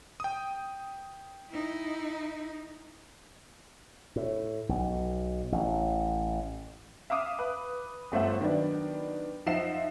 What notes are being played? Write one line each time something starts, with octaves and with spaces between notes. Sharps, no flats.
G5 D#6
D#4 E4
A2
B1
A1
E5 F5 D6 D#6
B4
G1 A3 C5 E5 F#5
D#3 F#3 B3 D4
F3 D#4 E5 F#5 C7 E7